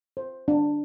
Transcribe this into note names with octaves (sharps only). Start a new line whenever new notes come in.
C5
D4